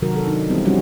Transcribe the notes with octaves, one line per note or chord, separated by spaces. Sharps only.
C3 D#3 F#3 F#4 A#4
A4
D#3 D4 D#4
E3 G3 B3 C4 E4
F3 G3 C4 C#4 E4 F#4